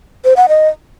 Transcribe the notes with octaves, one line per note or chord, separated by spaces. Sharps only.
C5
F#5
D#5